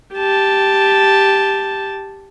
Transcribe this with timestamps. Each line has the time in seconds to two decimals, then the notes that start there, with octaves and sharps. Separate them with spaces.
0.14 G4 A5